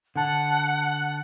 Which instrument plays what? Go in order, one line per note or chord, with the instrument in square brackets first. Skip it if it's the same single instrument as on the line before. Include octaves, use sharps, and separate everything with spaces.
[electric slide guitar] D3 A5 [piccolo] F#5